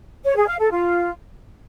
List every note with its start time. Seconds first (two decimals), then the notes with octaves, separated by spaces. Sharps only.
0.24 C#5
0.36 G#4
0.47 F5
0.59 A4
0.71 F4